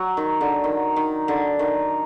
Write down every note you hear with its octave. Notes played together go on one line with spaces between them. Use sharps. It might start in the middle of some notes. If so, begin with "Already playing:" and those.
Already playing: F#3
D#3
D3
D#3
D#3
D3
D#3